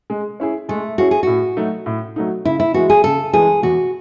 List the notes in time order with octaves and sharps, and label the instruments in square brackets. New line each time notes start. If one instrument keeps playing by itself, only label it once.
[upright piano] G#3
C#4 E4 G#4
[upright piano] G#3 [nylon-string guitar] A3
[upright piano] C#4 E4 G#4 [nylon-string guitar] F#4
[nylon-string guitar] G#4
[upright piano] A2 [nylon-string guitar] F#4
[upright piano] F#3 A3 D#4
A2
F#3 A3 D#4
[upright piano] C#3 [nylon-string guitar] E4
[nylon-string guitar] E4
[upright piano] E3 G#3 [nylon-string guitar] F#4
[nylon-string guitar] G#4
[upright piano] C#3 [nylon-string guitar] A4
[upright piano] E3 G#3 [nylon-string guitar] G#4
[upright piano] E2 [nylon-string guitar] F#4